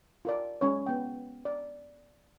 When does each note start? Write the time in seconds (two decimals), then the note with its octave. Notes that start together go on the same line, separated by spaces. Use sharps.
0.25 F4 A#4 D5
0.61 G#3 C#4 C#5
0.86 B3 G5
1.45 D5